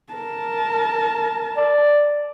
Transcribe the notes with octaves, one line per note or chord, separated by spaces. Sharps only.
A#4 A5
D5